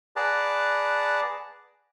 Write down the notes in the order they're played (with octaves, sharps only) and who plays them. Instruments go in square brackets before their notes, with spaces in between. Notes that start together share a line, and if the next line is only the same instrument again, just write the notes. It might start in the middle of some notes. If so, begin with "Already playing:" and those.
[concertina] G#4 B4 D5 F#5 A5 A#5